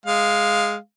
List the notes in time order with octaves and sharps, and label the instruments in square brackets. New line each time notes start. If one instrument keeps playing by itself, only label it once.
[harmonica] G#3 F5